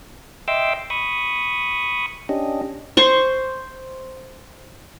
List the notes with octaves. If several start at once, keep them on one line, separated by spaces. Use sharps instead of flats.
D#5 E5 G5 C6 D6 E6
B5 C#6 D#6
C#4 D4 G4 D#5
C5 C#6